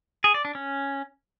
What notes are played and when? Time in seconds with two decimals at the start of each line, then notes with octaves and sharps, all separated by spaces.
0.24 G#4
0.34 D5
0.45 D4
0.55 C#4